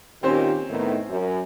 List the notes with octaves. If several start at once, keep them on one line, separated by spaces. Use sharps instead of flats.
A#2 D#3 C4 C#4 G4 C5
A2 D#3 B3
F#2